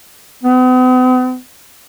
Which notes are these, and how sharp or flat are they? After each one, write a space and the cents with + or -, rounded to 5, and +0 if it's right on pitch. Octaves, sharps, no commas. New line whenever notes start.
B3 +45